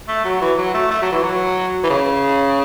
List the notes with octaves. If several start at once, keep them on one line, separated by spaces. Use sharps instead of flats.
A3
F#3
E3
F#3
A3
A3
F#3
E3
F#3
E3
C#3